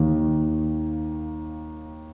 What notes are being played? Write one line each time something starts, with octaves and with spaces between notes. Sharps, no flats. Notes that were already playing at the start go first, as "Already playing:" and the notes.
Already playing: D#2 D#3 A#3